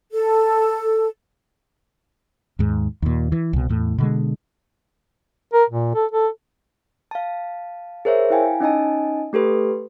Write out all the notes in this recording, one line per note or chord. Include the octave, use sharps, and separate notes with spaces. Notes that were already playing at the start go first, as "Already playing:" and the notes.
A4
D#2 G#2
D#2 A#2
E3
C2 B2
E2 A2
B2 D3 G#3
A#4
A#2
A4
A4
F5 A5
G#4 A#4 C5 C#5 E5
E4 F5 G5 G#5
C#4 D#4 D#5 G#5 A5
A3 G4 A4 B4 C6